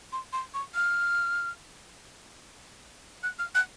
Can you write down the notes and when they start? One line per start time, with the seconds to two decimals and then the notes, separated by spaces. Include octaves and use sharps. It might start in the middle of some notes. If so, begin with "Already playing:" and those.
0.12 C6
0.33 C6
0.54 C#6
0.75 F6
3.23 F#6
3.39 F6
3.55 F#6